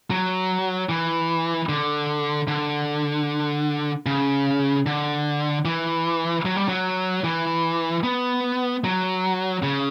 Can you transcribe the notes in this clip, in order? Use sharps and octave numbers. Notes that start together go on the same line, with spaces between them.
F#3
E3
D3
D3
C#3
D3
E3
F#3
G3
F#3
E3
B3
F#3
C#3